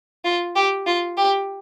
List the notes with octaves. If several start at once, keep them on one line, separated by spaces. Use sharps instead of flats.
F4
G4
F4
G4